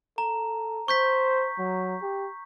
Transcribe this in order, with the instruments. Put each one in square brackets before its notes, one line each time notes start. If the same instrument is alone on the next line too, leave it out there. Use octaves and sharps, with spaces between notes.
[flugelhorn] A4 [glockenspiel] A#5
[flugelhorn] C5 [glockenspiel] C#6 G6 B6
[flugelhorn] F#3
G4